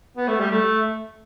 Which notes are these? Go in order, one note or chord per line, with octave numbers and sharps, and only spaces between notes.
B3
A3
G3
A3